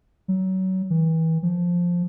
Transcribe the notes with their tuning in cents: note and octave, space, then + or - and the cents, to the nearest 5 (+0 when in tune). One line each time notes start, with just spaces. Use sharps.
F#3 +25
E3 -30
F3 +5